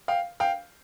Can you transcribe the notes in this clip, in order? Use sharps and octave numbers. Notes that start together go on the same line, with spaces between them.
F5 G5
F5 G5